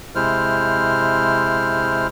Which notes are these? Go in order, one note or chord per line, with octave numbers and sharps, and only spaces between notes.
C3 G#3 E4 C5 F6